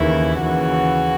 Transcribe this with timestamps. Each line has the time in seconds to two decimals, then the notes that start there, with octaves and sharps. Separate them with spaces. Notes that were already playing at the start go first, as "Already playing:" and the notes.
Already playing: D#2 C#3 E3 E4
0.41 D#2 C#3 E3 F#4